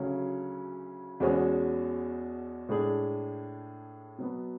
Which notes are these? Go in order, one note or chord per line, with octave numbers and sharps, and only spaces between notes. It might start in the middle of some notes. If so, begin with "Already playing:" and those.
Already playing: D2 C#3 F#3 C#4
E2 B2 G#3 C#4 F#4
A2 G#3 D4 G#4
B2 F#3 B3